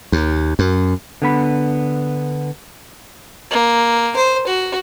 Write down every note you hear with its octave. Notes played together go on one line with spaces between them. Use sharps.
D#2
F#2
D3 B3 B5
A#3
C5
F#4